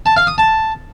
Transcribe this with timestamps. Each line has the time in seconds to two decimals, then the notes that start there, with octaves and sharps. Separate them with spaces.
0.06 A5
0.17 F5
0.27 D#6
0.38 A5